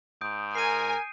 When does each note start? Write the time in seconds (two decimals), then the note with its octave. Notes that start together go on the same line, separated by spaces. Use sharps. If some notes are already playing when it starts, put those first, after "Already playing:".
0.21 G#2 D#6 G6 D7
0.55 A#4 G#5 C7 D#7